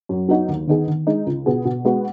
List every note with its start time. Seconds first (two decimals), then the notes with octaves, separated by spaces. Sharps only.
0.09 F#2
0.29 F#3 B3 D#4 F#4
0.48 D#2
0.67 D#3 B3 D#4 G#4
0.87 D#3
1.07 G#3 D#4
1.26 C#2
1.46 B2 B3 G#4
1.65 B2
1.85 G#3 B3 F#4